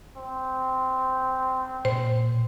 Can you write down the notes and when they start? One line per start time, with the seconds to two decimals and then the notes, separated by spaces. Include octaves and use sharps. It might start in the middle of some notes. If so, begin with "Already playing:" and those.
0.17 C4
1.85 A#2 C5